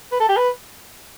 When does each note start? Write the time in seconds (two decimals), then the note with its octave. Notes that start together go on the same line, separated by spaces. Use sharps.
0.12 B4
0.20 A4
0.29 G4
0.37 B4